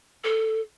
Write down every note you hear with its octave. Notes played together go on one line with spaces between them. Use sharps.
A4